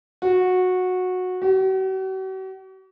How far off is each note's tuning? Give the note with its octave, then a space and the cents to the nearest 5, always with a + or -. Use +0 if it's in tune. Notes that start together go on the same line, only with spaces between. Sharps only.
F#4 -15
F#4 +45